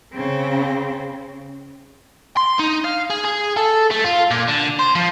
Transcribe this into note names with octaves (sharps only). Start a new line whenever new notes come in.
C#3 C4
C6
D#4
F5
G#4
G#4
A4
A3
F4
A#2
D3
C5
F3